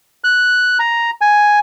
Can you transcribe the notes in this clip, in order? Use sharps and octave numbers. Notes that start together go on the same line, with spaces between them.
F#6
A#5
G#5